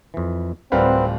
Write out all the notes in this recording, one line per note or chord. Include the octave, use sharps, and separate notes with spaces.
F2 E3
D1 G3 C4 F4 A#4 B4 F#5